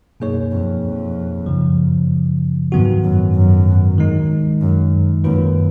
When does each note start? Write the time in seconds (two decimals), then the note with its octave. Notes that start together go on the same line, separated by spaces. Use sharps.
0.20 F#2 B2 A#3 D#4 G#4 C#5
0.51 F2
0.83 F2
1.46 F#2 C#3 F3
2.72 F2 G#2 D#3 F#3 B3 F#4
3.04 F#2
3.35 F#2
3.98 D#3 G#3 D#4
4.61 F#2
5.24 F#2 D#3 A#3 F4 B4